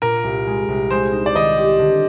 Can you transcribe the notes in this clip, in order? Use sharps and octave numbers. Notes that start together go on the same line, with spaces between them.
A#2 A#4
C2
G#3
C2
G#3 C5
D#4
D5
D#3 D#5
G4
D3